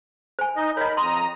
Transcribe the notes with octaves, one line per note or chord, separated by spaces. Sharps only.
C5 G#5
D#4 D#5
A#4 C#5 D#5 B5
F2 A#5 C6 D#6